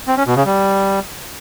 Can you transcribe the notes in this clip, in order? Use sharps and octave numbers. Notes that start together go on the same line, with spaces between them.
C4
C#4
B2
C#3
G3